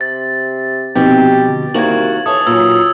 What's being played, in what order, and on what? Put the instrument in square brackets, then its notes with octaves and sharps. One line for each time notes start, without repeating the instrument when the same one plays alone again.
[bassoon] C3 [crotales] A6
[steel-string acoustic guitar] B2 [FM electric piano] F3 C4 D#4 [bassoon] G4
[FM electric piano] D3
[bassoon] C2 [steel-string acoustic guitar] D#3 A#3 F#4 [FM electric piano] D#4 [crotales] G#6 F#7
[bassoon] E3 [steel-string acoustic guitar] A4 C#5 [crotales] D#6
[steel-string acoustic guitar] A#2 F#3 [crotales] E6